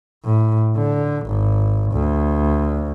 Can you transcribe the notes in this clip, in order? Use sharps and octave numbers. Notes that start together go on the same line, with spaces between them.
A2
D3
G#1
D2